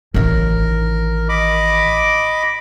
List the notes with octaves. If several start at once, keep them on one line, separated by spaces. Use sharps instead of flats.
A1 D#3 A#4
D#5 B5 D6